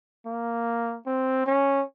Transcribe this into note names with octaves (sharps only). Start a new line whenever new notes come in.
A#3
C4
C#4